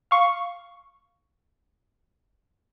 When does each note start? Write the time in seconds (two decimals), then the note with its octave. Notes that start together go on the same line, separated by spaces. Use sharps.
0.11 F5 C#6